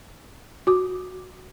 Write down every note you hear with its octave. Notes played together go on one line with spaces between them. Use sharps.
F#4 D6